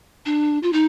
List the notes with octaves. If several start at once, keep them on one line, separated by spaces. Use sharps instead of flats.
D4
F4
D#4